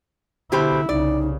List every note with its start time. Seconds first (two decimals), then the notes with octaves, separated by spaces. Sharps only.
0.52 B2 D3 E4 G4 C5
0.89 C2 C#3 D#4 D5